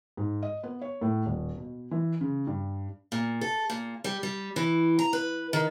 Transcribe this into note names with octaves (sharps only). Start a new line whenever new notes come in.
G#2
D#5
B3
C#5
A2
D#1
B2
E3
C#3
G2
A#2
A4
A#2
G3
G3
E3
A#5
B4
D#3